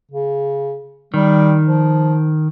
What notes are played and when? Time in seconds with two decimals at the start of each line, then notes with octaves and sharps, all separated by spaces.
0.11 C#3
1.14 D#3 G3
1.65 F3